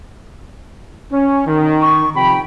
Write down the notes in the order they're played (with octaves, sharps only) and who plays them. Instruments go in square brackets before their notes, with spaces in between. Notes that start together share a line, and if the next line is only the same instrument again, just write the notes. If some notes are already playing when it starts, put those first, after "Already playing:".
[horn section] C#4
D#3
[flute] C#6
[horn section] C3 F3 B5 [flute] G5